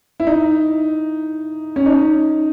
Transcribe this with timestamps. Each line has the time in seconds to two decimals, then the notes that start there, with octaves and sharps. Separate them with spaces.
0.20 E4
0.27 D#4
1.76 C#4
1.86 D#4